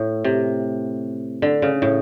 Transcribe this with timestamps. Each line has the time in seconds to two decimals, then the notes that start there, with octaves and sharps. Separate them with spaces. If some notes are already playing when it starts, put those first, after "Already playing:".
Already playing: A2
0.24 C3
1.42 D3
1.62 C#3
1.82 A2